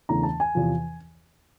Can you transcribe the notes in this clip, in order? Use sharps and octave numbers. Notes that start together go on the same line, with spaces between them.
E2 C#3 E3 A3 D4 A#5
A5
G#5
E2 C3 F3